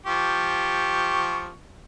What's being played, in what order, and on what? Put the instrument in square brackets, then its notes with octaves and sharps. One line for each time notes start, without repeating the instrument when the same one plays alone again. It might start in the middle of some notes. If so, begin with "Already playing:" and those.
[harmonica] F3 G4 C#6